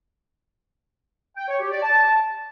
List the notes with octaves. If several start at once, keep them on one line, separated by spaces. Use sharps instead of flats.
G5
C#5
G4
D5
A5